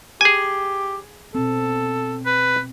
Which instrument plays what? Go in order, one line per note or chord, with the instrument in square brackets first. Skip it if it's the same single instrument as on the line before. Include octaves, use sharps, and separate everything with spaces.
[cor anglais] G4 [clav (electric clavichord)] G#4 G#5
[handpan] B2 C4 [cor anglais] A4
[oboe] B4